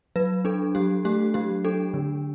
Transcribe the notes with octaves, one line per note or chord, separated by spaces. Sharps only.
F#3 B4
D4 A4
F#3 G4
A3 G4
F#3 G4
D4 A4
D3